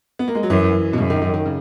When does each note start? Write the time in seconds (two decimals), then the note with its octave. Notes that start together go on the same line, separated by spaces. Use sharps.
0.19 B3
0.28 A#3
0.35 G#3
0.43 F#3
0.50 F#2 E3
0.93 B2
0.98 F#2 C#3
1.10 D#3
1.22 D#3
1.34 D#3
1.46 C#3